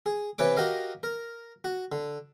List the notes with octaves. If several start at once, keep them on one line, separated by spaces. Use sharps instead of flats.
G#4
C3 E3 B4 C#5 D6
F#4 G4 A#4 D#5 F5
A#4
F#4
D3